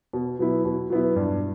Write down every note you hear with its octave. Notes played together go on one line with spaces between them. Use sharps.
B2
F#3 B3 E4
B2
F#3 B3 E4
G2